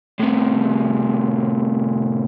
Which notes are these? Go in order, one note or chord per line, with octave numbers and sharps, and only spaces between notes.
A2 C3